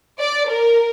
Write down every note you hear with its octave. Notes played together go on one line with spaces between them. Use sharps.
D5
A#4